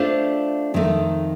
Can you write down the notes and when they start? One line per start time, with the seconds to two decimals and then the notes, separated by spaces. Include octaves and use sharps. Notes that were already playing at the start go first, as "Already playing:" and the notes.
Already playing: A3 D4 F4 C5 F5
0.74 F2 D#3 A3 D#4